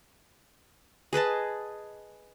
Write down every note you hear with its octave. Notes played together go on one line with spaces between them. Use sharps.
G#4 B4 D#5 A5